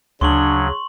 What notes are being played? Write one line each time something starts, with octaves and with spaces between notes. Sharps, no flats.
D2 C#3 F#3 D4 C6 C#6 F#7